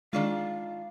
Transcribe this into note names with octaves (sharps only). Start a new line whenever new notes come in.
D#3 G#3 D4 F4 D5 F5